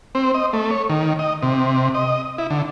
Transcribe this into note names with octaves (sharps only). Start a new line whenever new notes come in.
C4
D#5
A3
C#5
D#3
D#5
C3
D#5
E4
D3